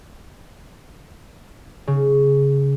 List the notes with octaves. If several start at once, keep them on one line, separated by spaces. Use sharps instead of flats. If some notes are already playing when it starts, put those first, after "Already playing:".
C#3